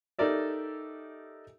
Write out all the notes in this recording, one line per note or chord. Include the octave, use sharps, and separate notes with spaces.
D#4 G4 A4 A#4 D5 E5